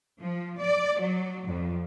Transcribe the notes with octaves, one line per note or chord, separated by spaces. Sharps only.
F3
D5
F#3
F2